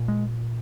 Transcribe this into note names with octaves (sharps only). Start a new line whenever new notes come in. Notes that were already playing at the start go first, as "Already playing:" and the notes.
Already playing: A#2
G#3